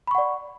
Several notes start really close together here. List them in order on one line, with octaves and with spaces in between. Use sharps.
B5 C#6 F#5 D5